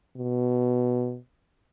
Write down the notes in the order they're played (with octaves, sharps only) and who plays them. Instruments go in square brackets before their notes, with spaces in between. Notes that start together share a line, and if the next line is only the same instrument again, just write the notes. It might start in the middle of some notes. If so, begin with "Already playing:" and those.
[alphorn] B2